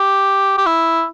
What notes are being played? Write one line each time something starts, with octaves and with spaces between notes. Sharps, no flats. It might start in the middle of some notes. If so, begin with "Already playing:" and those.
Already playing: G4
G4
E4